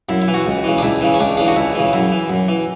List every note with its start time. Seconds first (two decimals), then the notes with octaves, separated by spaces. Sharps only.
0.09 F#2 E4
0.22 E4
0.28 E3
0.34 F#4
0.46 C#2
0.64 C#3 E3
0.78 D4
0.82 C#2 E4
1.01 C#3 E3
1.14 C#4
1.19 C#2 D4
1.37 C#3 E3 D4
1.48 F#4
1.56 C#2 E4
1.75 C#3 E3
1.93 F#2 E4
2.12 E3
2.30 F#2
2.48 E3